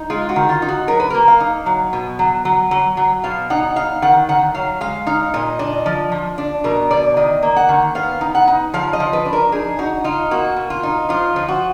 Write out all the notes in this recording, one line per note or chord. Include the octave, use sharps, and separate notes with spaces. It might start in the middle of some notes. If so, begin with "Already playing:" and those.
Already playing: D#4
G#3 F4
F#4
D#3
F4
D#4
F#4
F#3 A#4
B4
A#3 A#4
F5
D#4
F#3
B2
F#3
F#3
F#3
F#3
B2 F5
D#4 F#5
D#4 F5
D#3 F#5
D#3 F#5
F#3 F5
G#3 F5
D#4 F5
A#2 D#5
D4 D#5
F3
F3
D4
B2 A#4
B2 D5
D#3 D#5
A#3
F#5
D#3
B3 F5
D#4
F#5
D#4
F3 F5
D#5
F3
B4
D4
A#4
D#4 G#4
D#4 F#4
D#4 F4
A#3 F#4
B2
F4
D#4
F3 F4
F3
F#4